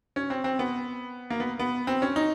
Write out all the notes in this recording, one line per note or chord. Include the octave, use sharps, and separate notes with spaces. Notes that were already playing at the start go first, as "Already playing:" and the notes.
C#4
C4
C4
B3
A#3
B3
B3
C4
C#4
D#4